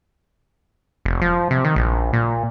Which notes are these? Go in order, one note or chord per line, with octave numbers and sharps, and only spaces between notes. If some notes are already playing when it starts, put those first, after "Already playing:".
F1
F3
C3
D#3
A#1
A#2